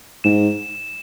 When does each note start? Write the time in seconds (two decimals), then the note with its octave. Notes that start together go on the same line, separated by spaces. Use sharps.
0.24 G#2 E7